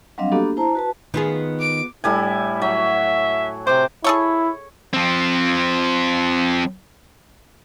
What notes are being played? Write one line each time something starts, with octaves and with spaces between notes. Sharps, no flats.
F#3 G3 C4 D4 D#5 F5
A#3 B3 D4 F#4 G4 A4
E4 C5 A5 A#5
F#4 B4 A5
D#3 B3 F4 G#4
D6 D7
A2 G3 E4 G#5
F#3 E5
C3 C5 D6
E4 G#4 A4 C#5
F3 C4